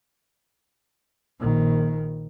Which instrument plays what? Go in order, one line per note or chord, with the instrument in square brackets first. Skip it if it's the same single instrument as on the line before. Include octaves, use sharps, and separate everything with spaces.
[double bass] A#1 D#3